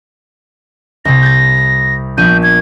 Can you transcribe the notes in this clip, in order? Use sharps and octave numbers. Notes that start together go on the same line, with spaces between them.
C2 C3 A#6
G6 A6
A#1 B3 G6 D#7
G#6